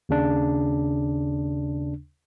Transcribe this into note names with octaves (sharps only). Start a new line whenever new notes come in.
D#2 C#3 D4